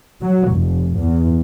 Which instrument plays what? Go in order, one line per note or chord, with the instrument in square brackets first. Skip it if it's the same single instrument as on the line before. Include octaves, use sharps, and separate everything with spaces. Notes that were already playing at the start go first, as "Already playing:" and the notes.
[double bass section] F#3
F1
E2